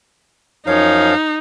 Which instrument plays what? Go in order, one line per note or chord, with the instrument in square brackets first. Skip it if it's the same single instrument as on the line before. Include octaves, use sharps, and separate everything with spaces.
[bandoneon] F#2 F3 F5 [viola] D#4 [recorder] C#5